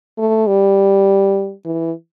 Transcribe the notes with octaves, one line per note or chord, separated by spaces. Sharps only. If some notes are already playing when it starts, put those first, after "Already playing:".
A3
G3
E3